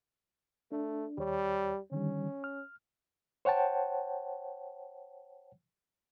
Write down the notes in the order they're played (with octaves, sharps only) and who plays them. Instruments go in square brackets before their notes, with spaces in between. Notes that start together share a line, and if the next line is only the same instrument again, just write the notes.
[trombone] A3 [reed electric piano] D4
[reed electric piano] D#2 C#5 [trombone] G3
[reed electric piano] D3 D#3 G3 [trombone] C#4
[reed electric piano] F6
C5 C#5 F#5 G5 A5